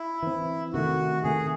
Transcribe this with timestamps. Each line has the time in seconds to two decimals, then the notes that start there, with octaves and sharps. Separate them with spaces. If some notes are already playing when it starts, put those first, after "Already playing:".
Already playing: E4
0.23 E3 C4
0.73 C3 D#3 A3 F#4
1.24 C3 D#3 A3 G#4